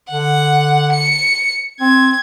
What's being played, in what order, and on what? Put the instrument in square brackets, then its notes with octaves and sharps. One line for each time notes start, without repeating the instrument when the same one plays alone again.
[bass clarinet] D3 [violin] F#5
[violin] C#7
[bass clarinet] C4 [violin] G#6